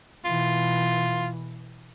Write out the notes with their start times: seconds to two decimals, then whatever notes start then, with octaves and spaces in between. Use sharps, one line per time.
0.25 B2 E3 F4